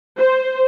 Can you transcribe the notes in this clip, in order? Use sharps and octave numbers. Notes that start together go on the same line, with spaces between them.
C5